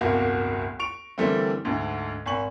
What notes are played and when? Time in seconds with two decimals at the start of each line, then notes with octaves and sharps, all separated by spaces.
0.01 D1 G1 C2 A#3 F#4
0.79 C#6 D7 F7
1.18 D3 E3 G3 A3 A#3 C4
1.65 D2 G#2 D3
2.26 G#1 G#5 C#6 F#7